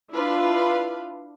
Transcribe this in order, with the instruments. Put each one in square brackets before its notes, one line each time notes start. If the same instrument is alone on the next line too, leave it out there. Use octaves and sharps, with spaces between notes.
[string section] D4 E4 F4 B4 F5